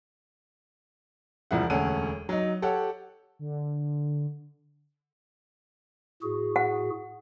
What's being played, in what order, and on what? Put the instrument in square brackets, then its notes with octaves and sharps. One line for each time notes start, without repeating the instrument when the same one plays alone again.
[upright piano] E1 C2 F3 E4 F#5
E1 D2 C#4 A4 F#5 D#7
F#3 D#4
G4 A4 C#5 F#5
[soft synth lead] D3
[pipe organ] A2 F#4 G#4
[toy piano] F#5